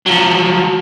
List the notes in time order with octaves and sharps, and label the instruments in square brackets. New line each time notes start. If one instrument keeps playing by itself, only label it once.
[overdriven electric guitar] F3 F#3